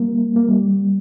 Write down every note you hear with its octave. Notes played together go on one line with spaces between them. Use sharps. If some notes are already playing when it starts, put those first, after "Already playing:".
Already playing: G3 A#3
A#3
G3